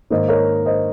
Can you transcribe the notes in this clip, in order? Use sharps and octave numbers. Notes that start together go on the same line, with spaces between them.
G#2 D#3 A#3 C5 D#5
A#4 C#5
C5 D#5